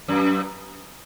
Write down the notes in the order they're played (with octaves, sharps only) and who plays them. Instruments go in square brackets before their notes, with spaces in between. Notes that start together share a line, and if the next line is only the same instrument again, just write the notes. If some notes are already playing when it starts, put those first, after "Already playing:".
[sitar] F#2